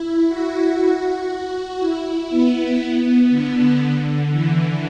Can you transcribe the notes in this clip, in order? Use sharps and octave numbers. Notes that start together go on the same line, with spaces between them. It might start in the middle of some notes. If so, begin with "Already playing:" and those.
Already playing: E4
F#4
F#4
E4
B3
D3
D3
E3